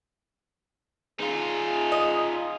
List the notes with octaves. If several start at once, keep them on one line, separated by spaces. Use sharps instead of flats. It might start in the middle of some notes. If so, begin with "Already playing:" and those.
D#4 F4 G#4
D#5